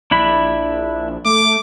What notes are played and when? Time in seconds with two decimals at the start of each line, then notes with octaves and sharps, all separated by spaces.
0.11 A#1 D4 E4 B5
1.25 A3 D6